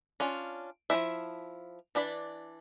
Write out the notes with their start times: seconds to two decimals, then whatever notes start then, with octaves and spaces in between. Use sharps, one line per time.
0.20 C#4 D4 F4
0.90 F3 D#4 E4 E5
1.95 E3 D4 D5 B5